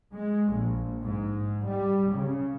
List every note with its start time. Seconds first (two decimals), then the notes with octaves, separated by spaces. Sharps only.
0.15 G#3
0.54 A#1
1.04 G#2
1.69 G3
2.15 C#3